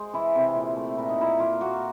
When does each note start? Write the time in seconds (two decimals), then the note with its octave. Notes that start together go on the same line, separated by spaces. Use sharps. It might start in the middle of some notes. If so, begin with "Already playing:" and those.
Already playing: G#3 C5
0.14 E3 E4
0.35 C3
0.55 A#2
0.76 A3
0.98 A#2 E4
1.09 D#4
1.18 A#2 E4
1.40 A#3 F4
1.61 A#3 F#4